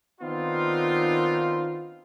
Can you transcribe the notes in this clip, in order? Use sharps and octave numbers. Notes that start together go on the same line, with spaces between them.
D#3 B3 C4 D4 D#4 F4